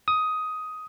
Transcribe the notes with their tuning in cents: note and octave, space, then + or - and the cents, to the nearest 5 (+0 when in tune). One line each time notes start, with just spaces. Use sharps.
D#6 +10